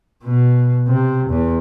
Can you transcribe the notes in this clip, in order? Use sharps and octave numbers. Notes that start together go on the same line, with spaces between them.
B2
C3
E2